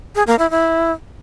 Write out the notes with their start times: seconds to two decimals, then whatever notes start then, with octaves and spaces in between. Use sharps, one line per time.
0.15 G#4
0.27 A#3
0.39 E4
0.50 E4